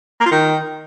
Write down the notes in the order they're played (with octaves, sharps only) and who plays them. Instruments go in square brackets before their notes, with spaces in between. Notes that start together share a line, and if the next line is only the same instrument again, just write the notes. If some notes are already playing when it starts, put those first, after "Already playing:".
[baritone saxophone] A#3
F4
D#3